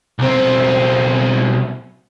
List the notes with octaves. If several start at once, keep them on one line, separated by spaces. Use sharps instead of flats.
B1 C4